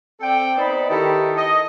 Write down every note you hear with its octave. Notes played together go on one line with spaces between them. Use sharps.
C4 A4 D5 G5
B3 D#4 C5 D5 B5
D#3 D#4 E4 G4 A4
D#5